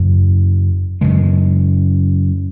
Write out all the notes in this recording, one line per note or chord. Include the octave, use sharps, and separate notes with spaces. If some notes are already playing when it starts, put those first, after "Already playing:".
Already playing: F#2 C#3
F#2 C#3 G#3